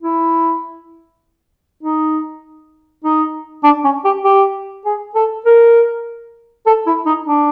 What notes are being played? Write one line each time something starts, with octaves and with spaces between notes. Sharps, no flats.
E4
D#4
D#4
D4
C#4
G4
G4
G#4
A4
A#4
A4
E4
D#4
D4